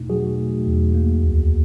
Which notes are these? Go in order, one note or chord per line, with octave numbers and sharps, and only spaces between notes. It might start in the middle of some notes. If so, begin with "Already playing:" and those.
Already playing: E2 B2 A3 D#4
F#3 F#4 G#4
A3
E2
A#3
D2